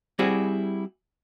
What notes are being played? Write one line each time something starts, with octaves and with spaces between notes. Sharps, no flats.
G3 C4 E4 F#4 G#4